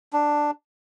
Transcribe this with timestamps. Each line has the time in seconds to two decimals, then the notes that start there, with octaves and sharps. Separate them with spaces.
0.13 D4